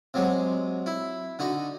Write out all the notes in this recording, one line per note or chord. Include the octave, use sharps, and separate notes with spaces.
C3 F#3 G#3
E4
D3 D#4 F#4